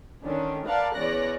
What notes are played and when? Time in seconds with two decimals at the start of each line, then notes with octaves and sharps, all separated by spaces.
0.24 D3 D#3 C#4 D4
0.67 A#4 B4 D5 F5 F#5 A5
0.95 E2 C#4 C#5 D5 F#6 A#6